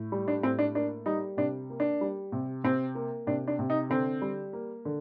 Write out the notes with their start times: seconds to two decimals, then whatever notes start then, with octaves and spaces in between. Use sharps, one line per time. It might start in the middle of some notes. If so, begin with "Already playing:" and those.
Already playing: A2
0.12 G3
0.28 D4
0.43 A2 C4
0.59 D4
0.75 A#3 D4
1.06 G3 D#4
1.37 C3 D4
1.70 A#3
1.80 D4
2.01 G3
2.32 C3
2.64 C3 C4
2.95 A#3
3.27 C3 D4
3.48 D4
3.59 C3
3.70 D#4
3.90 D3 C4
4.22 G3
4.53 A#3
4.85 D3